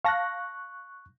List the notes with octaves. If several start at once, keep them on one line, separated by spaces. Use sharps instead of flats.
F5 A5 C#6 F#6 A#6